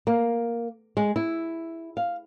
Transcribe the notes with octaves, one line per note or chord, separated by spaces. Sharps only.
A#3
G#3
E4
F5